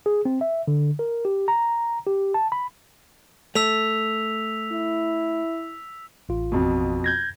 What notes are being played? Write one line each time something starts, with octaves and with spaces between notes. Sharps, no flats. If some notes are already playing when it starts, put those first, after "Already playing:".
G#4
C4
E5
D3
A#4
G4
A#5
G4
A5
B5
A3 E6 B6 F7
E4
A1 F4
F2 B2
G6 G#6 A#6